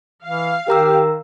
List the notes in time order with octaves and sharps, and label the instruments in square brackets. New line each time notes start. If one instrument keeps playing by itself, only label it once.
[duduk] E3 [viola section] F5
[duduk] D#3 [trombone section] G4 [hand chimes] A#4 A#5 E6